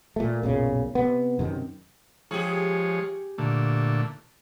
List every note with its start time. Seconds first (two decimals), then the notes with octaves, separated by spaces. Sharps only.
0.16 A#2 A3
0.43 B1 F#2 A#2 C#3
0.95 C3 B3
1.39 F#2 C3 D#3
2.31 F3 G#3 G4 G#4 C#5
3.38 A#2 D3 A3